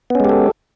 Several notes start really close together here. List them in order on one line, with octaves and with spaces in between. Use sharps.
B3 C#4 G#3 G4 A4